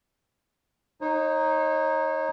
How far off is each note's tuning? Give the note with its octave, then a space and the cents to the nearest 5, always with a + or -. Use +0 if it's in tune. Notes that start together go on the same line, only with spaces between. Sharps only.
D#4 +0 C#5 -40